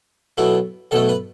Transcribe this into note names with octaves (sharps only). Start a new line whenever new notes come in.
B1 B2 A3 E4
B1 B2 A3 A4
B4